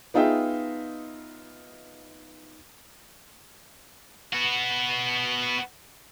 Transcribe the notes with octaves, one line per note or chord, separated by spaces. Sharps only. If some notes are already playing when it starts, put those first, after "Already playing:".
B3 D#4 F4 G#4 E5 G5
B3 F#4